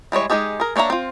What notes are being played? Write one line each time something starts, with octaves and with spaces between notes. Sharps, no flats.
E3 G3 G#3 C#5
G#3 A3 D#4 G4 G#4
G#4 A#4
A#3 D4 C#5 E5 A#5
C4 F4